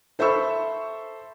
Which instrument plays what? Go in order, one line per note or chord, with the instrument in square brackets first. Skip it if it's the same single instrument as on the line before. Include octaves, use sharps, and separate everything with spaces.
[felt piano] A4 C5 E5 B5 C#6 E6